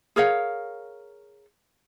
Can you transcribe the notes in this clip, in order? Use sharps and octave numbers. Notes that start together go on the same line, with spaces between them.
G#4 A#4 C#5 F5